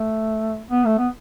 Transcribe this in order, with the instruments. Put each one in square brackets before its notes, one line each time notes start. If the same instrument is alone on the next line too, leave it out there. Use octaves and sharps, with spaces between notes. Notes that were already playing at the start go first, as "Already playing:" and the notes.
Already playing: [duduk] A3
B3
A3
B3